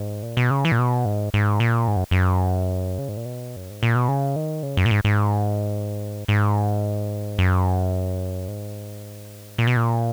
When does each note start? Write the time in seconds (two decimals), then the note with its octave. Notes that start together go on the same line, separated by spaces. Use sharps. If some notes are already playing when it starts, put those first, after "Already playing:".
Already playing: G#2
0.23 A#2
0.37 B2
0.51 C#3
0.65 E3
0.72 A#2
0.79 B2
1.05 G#2
1.34 G#2
1.60 A#2
1.88 G#2
1.96 F#2
2.11 F#2
2.98 C#3
3.09 G#2
3.17 A#2
3.26 B2
3.56 F#2
3.70 G#2
3.83 A#2
3.95 B2
4.08 C#3
4.36 D#3
4.63 C#3
4.77 F#2
4.86 A#2
4.91 G#2
5.05 G#2
6.28 G#2
7.39 F#2
8.48 G#2
9.58 A#2
9.67 B2
9.77 A#2